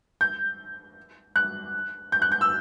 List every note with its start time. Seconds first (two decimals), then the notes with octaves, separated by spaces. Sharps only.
0.21 G6
1.36 F#6
2.12 G6
2.22 F#6
2.32 G6
2.41 E6